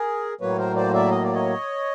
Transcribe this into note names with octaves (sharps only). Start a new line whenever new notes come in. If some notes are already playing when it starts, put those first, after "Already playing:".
Already playing: G#4 A#4
A2 F#3 A#3 B4 C#5
A#4 C5
C5 D5
D5 E5
D#5
D5
C#5 D#5